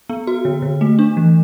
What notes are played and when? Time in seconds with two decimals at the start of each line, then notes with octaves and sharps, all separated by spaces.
0.09 B3
0.27 F#4
0.45 D3
0.62 D3
0.81 A3
0.99 D4
1.17 E3